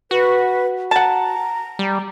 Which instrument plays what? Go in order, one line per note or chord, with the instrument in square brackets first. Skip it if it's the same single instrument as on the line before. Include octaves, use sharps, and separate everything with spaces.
[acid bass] F#4 [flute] B4
[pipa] F#5 A5 [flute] A#5
[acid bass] G3